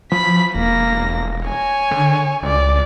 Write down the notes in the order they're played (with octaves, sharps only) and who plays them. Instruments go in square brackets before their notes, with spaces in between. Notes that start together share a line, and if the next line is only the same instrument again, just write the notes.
[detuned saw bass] F3 [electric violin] B5 B6
[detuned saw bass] E1 [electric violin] A#3 A#6
[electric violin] C#5 G#5
[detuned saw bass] D3
[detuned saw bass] C#2 [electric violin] D5